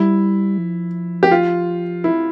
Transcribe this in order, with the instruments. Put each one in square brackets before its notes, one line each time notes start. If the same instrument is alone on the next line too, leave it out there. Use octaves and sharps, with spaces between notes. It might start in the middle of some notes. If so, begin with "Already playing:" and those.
Already playing: [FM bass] G3 [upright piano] E4
[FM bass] F3
[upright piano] G4
F4
E4